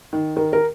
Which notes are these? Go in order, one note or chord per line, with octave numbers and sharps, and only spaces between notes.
D#3
D#3 A#4
A#4